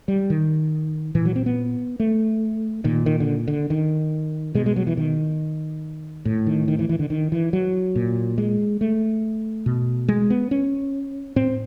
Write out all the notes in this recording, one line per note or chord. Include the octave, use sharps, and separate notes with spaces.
G3
D#3
A#2 E3
F#3
C4
B3
A3
A#2 D#3
D#3
D3
D3
D#3
B2 G#3
G#3
F#3
E3
D#3
A2
D#3
D#3
E3
E3
D3
D#3
E3
F#3
A#2
G#3
A3
B2
G#3
B3
C#4
A2 C4